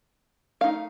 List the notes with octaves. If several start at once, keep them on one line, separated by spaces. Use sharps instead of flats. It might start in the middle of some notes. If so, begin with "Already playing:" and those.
A3 D#4 F5